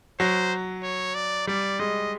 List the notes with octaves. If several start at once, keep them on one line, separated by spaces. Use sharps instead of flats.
F#3 C5
C#5
D5
G3 D5
G#3 D#5